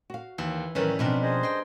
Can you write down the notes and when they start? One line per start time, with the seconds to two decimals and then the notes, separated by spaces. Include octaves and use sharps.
0.10 F#4 F5
0.38 D#2 E3
0.75 A2 D#3 E3 F#3 G3 C#4 A#4 B4
0.99 B2 F3 B3 C4 D4 A#4
1.22 G#4 C5 D#5
1.43 G5 C6